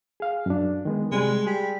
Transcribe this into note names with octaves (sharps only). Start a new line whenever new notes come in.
G#4 F5
F#2 D4
D#3 G#3 B3
C3 G3 G#3
G3 G#4